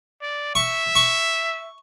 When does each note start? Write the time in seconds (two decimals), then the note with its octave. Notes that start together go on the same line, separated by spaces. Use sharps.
0.21 D5
0.55 E5 C#6
0.95 C#6